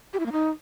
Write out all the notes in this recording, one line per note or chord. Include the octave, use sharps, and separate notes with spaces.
G4
E4
A#3
D#4